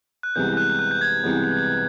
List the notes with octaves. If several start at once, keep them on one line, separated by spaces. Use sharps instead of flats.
F#6
C2 C3 E3 G#3 B3 G6
F#6
F#6
G6
G#6
C2 C3 E3 G#3 B3